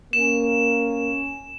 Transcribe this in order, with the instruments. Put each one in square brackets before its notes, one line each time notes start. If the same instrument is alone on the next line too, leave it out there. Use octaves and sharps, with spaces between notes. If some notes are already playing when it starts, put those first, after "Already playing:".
[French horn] A#3 [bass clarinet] C#4 [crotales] E7